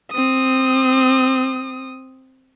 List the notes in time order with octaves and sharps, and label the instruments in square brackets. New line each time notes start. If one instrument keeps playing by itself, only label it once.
[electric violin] C4 D#6